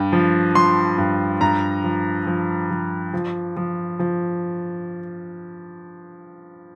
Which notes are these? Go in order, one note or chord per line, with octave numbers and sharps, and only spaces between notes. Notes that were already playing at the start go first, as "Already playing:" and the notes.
Already playing: G2 G5
F3
F3 C6
G2
G2 A#5
F3
F3
F3
F3
F3
F3